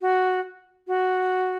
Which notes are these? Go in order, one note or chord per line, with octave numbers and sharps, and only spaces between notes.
F#4
F#4